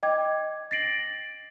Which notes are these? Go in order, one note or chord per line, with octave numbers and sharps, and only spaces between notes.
D#5 G5 D6 G#6
A6 A#6 C7 D7 F#7